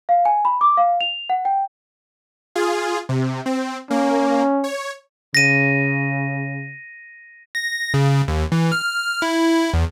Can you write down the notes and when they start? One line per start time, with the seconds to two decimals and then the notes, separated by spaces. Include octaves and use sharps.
0.09 F5
0.25 G#5
0.45 B5
0.61 D6
0.77 F5
1.01 F7
1.30 F#5
1.45 G5
2.55 F4 G#4
3.09 C3
3.46 C4
3.90 A#3 C#4
4.64 C#5
5.35 C#3 A#6 D#7
7.55 A#6
7.94 C#3
8.28 D#2
8.52 E3
8.72 F6
9.22 E4
9.74 E2